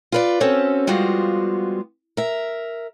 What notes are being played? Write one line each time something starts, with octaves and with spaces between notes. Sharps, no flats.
F4 B4 D5
C4 C#4 F#4 A4
F3 G3 G#3 B3 F4 F#4
A#4 E5